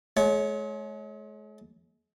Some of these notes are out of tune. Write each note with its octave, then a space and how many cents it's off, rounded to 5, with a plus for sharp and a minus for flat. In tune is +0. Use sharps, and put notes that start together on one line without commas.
G#3 +40 C#5 +0